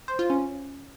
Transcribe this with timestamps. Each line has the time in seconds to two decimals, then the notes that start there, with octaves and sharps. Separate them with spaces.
0.08 C5
0.19 F4
0.30 C#4